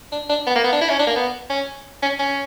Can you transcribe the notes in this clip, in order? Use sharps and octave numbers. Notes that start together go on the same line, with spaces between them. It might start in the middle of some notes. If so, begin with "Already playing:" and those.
D4
D4
B3
A#3
B3
D4
E4
C#4
D4
A#3
B3
C#4
C#4
C#4